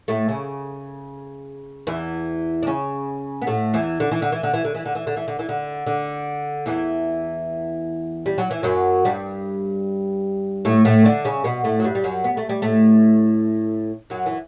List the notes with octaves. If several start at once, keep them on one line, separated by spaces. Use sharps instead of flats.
A2 A3
C#3
E2 E3
D4
C#3 C#4
B3
A2 A3
E2 E3
D3
E3
D3
E3
D3
E3
D3
E3
D3
E3
D3
E3
D3
E3
D3
D3
E2 E3
G3
F#3
E3
F#2 F#3
G2 G3
A2 A3
A2 A3
D3 D4
C#3 C#4
B2 B3
A2 A3
F#3
G2 G3
G3
F#2 F#3
B3
A3
G3
A2 A3
F#2 F#3
E3